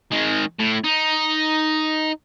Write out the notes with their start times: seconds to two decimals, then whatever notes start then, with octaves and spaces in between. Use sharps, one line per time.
0.12 D#3 G#3
0.60 A2
0.84 D#4